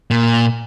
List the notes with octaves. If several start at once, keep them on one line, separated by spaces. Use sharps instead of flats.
A#2